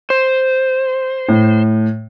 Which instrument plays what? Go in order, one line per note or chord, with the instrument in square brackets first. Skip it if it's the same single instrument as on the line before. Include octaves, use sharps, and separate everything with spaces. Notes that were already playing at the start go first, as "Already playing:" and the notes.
[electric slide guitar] C5
[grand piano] A2